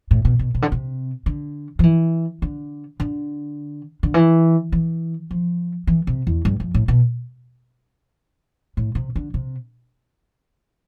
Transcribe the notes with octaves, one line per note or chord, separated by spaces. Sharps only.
A2
B2
B2
C3
D3
C3
D3
F3
E3
D3
D3
D3
E3
E3
F3
E3
C3
E2
G2
F2
A2
B2
A2
C3
D3
C3